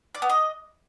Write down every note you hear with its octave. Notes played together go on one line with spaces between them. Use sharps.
D5
B3
D#5